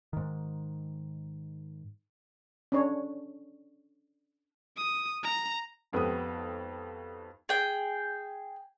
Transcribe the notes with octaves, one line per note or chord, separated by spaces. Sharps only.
G#2 D#3
C#4 D4 C#5
D#6
A#5
G#1 F2 B3 G4 A4 D#6
G#4 G5